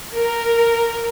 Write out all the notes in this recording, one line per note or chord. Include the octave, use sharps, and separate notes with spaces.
A#4